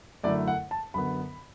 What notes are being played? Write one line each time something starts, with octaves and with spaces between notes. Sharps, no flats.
F#2 D3 A3 E4 D5
F#5
A5
F#2 D3 B3 B5